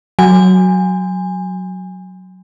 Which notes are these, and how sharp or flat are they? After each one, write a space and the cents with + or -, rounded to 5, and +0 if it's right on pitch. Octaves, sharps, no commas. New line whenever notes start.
F#3 +0 G#5 -20